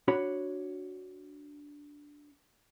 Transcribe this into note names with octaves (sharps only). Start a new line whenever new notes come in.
D4 F#4 C#5 B5